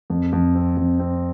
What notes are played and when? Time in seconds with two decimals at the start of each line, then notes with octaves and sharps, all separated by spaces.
0.10 F2
0.33 F2
0.55 C4
0.77 F2
0.99 C4